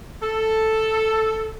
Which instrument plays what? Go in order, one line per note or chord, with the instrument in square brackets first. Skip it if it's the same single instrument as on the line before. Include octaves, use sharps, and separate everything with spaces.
[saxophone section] A4